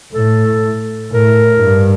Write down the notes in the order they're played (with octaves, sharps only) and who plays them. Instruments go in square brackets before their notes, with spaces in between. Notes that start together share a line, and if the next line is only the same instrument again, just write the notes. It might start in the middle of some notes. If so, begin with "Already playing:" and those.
[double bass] A2 [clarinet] A4
[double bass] A2 [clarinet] A#4
[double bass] G2